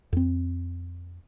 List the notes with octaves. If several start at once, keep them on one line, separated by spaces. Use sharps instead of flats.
F2 C4